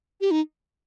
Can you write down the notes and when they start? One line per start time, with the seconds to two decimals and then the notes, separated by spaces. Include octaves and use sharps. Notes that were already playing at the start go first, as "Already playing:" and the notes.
0.21 G4
0.31 D#4